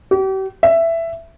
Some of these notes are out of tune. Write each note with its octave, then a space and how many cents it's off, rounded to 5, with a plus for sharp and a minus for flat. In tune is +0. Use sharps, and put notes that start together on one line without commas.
G4 -40
E5 +10